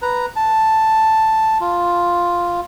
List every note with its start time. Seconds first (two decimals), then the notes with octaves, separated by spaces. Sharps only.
0.02 B4 A#5
0.36 A5
1.61 F4